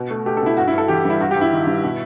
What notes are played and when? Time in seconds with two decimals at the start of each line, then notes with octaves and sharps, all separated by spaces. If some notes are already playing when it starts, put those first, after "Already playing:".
Already playing: B2
0.10 A3
0.26 A3 G4
0.37 A4
0.42 B2 E4
0.57 G2 F#4
0.68 E4
0.73 G2
0.78 A4
0.88 E3 G4
1.05 G3 E4
1.20 G2 F#4
1.31 G4
1.36 G2
1.41 E4
1.52 D#3
1.67 G3
1.84 B2